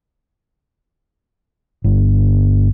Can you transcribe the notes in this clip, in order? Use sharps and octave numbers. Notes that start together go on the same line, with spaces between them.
G1